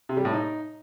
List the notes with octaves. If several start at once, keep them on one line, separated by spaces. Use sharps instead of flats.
C3
G3
A2
D#4